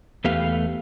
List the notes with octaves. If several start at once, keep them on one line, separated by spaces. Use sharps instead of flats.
E2 A3 B3 G4 B4 F5